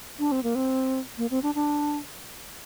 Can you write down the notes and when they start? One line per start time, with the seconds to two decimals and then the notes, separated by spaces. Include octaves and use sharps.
0.19 D4
0.32 C4
0.43 A#3
0.55 C4
1.18 A#3
1.31 C4
1.43 D4
1.55 D4